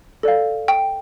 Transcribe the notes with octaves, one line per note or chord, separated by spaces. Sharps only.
A4 D5 F5
G5